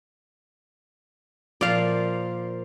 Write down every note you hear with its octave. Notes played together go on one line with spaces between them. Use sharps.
A#2 F3 D5 F5